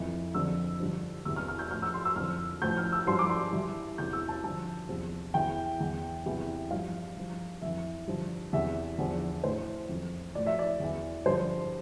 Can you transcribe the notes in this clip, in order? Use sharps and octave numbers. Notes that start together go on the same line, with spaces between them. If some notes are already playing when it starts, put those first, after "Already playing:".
Already playing: F2 E3
F2 D3 F3 E6
G2 D3 F3
E2 C3 E3 E6
F6
F6
G6
A2 F3 F6
E6
C6
E6
F2 D3 F3 F6
A2 F3 G6
F6
E6
G2 F3 C6
D6
C6
G2 E3
E2 C3 E3 G6
E6
A5
G2 D3 F3 A5
E2 C3 F3
E2 E3 G5
E2 E3
E2 C3 E3
G2 F3 F5
G2 F3
F2 E3 E5
G2 D3 F3
E2 C3 E3 E5
E2 D3 F3
A2 E3 C5
F2 E3
A2 F3 D5
E5
D5
E2 E3
G2 D3 F3 C5